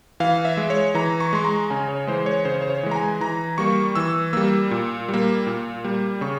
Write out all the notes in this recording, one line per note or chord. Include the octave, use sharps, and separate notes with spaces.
E3 F5
E5
G#3
C#5
E3 A#5
C#6
G#3 C6
A#5
C#3 G#5
C#5
E3 G#3 C5
C#5
C#3 C5
C#5
C5
C#5
E3 G#3
A#5
G#5
E3 A#5
G3 A#3 C#6
E3 E6
G3 A#3 E6
A#2
G3
A#3
A#2
G3 A#3
C#3 C#6